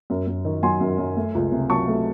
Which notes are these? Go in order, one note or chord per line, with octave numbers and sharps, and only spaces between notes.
F#2
F#2
D#3
F#3 G#5 C6
F#2
F#2
A3
C#2
C3
F#3 A5 C#6
A3